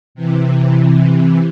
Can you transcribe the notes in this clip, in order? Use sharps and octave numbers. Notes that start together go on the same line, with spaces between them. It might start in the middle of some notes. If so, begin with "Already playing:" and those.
C3 E3